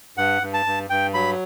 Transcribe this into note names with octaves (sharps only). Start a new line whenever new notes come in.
G2 F#5
G2
A5
G2
G2 G5
F#3 B5